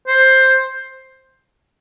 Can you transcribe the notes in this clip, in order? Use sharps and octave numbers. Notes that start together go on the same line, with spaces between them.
C5